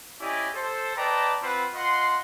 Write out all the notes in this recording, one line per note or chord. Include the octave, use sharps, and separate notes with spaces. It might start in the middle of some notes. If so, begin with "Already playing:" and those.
C#4 E4 G4 D5 D#5 G#5
A4 C5
B4 D5 D#5 G5 A5 A#5
C4 F4 B4 C5 F#5 B5
F4 D#5 F#5 C6